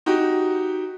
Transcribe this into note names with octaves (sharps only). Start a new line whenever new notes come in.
D#4 F#4 G4